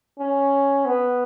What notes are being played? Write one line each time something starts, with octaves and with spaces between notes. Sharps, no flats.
C#4
B3